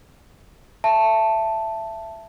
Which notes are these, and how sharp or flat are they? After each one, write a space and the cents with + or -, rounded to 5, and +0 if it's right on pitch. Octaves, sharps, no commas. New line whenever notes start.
E5 +15 A5 +0